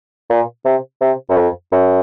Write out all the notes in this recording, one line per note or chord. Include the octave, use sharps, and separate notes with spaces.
A#2
C3
C3
F#2
F2
F#2